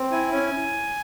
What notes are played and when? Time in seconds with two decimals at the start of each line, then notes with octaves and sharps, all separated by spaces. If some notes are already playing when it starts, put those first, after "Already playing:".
Already playing: C4
0.12 E4 G#5
0.32 C#4 G#5